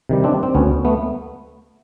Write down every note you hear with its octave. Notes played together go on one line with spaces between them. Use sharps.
C3 D#3 G3
C4 D4
C4
D2 B3 C#4
A3 B3